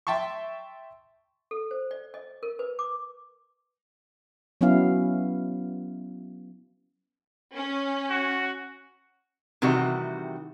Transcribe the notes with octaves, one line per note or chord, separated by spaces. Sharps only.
E5 G5 A5 C6 C#6
A4
C5
D5
D#5
A#4
B4
D6
F#3 B3 C#4 E4 F5
C#4
F#4
C3 D#3 E3 G3 F#4